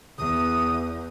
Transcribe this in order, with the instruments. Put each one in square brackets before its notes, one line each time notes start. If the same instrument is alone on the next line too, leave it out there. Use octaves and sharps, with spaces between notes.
[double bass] E2 [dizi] D#6